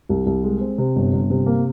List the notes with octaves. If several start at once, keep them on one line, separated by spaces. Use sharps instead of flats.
C2
C2
G#3
C4
C3
G1
G1
C3
A#3